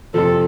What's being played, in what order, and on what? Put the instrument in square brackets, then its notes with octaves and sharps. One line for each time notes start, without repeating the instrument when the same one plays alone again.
[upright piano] F2 C3 F3 [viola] A4